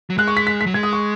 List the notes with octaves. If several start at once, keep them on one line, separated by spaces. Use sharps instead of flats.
F#3
G#3 F#6
C#6
B6
B6
B6
F#3
G#3 G#6
D#6
C#6